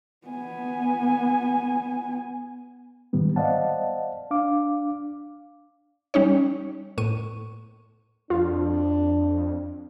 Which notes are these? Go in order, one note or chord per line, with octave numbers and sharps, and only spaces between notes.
B3 G#5
G#2 D#3 G3 B3
C5 D5 D#5 F5 F#5 A5
D4 F5 D6
G3 C#4 D#4 C#5
A2 C#6 D#7
F2 D4 F4